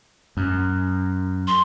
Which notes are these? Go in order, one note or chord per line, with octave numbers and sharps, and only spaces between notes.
F#2
C6